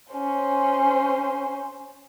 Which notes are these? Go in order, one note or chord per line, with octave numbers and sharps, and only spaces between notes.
C#4 C5